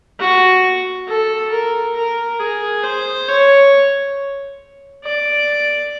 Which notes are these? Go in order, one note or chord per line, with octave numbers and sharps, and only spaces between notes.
F#4
A4
A#4
A#4
G#4
C5
C#5
D5